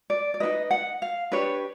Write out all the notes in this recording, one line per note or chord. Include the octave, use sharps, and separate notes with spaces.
D5
D5
D#4 F#4 B4 D#5
F#5
F5
D4 G4 B4 C#5